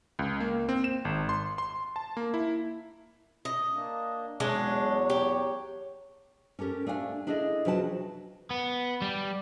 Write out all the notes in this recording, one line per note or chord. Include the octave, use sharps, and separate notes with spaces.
C#2
A#3
C4
E7
G#1
C6
C6
A5
A#3
E4
D#5
A#3 D4
E2 F#3 G#3 D4 C#5
G4
C#4 G4 A4 A#4
A3 D4 F5 F#5 G#5
D4 E4 G#4 A4 D5 D#5
C3 F3 F#3 B4 G5 A5
B3
G3